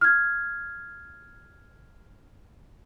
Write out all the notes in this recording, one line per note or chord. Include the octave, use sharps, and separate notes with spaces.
F6 G#6